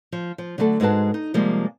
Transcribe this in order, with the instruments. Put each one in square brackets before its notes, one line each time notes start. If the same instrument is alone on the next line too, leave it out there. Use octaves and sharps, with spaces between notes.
[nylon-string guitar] F3
F3
D3 F#3 A3 G4 A4
G#2 G#3 A#3 F#4 B4 A5
D#4
C3 F3 G3 G#3 A#3